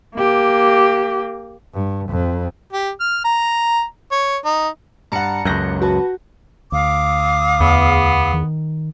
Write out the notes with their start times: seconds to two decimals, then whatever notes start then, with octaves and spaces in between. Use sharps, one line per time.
0.16 A#3 G4
1.74 G2
2.10 F2
2.72 G4
3.00 F6
3.24 A#5
4.11 C#5
4.45 D#4
5.12 G2 F#5 A5 A#5 C#7
5.45 C#2 F#2 F#6 G6 A#6
5.82 F#4 B4 A5
6.72 D2 F5 D6 D#6
7.60 E2 B3
8.33 D#3